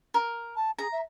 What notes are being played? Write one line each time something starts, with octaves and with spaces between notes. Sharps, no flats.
A#4
A5
G#4 A#5
E5